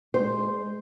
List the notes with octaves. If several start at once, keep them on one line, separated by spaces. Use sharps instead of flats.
G#3 C5